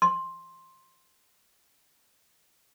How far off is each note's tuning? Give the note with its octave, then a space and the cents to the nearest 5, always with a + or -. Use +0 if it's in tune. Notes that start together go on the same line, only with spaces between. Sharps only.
C6 +10